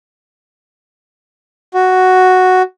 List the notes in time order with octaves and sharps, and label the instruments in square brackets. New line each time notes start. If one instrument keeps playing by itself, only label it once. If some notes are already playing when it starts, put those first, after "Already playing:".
[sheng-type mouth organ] F#4